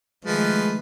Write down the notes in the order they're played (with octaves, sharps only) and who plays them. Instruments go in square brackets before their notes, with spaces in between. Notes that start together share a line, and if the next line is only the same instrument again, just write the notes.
[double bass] D#3 A3 [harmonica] F3 B4 [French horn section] G#3